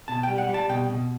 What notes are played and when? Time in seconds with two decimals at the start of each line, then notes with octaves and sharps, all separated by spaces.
0.08 B2 A5
0.23 G5
0.29 G3
0.38 F#5
0.49 G3
0.54 A5
0.69 B2 G5
0.90 B2